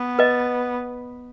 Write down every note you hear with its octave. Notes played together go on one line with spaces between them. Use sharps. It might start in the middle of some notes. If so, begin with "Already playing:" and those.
Already playing: B3
B4 D#5